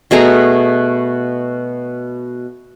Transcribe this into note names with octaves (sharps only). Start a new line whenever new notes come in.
B2 A3 G#4 A#5